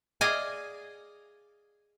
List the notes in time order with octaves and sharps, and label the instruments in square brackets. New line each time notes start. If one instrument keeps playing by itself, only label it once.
[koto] G#4 D5 D#5 F5 G#5